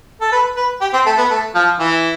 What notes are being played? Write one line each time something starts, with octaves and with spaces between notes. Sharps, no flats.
A4
B4
B4
G4
C4
A3
B3
A3
F3
E3